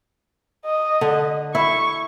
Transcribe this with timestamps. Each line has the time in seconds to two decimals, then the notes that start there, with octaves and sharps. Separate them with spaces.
0.65 D#5
1.01 D3
1.55 E4 C#6